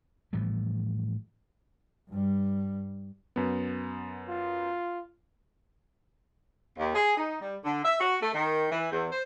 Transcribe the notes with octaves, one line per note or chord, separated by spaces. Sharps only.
A2 E3 F3 G3
G2 G3
F#2 B3
F4
D#2
G#4
D#4
G3
D3
E5
F#4
A3
D#3
E3
E2
C5